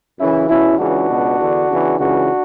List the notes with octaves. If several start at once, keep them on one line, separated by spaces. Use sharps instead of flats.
F#2 C#3 E3 C#4 E4
E2 B2 C#4 E4
C#2 C#3 E3 D4 F#4
C#2 B2
E2 D3
E2 C#3 E3
C#2 C#3 E3 D4 F#4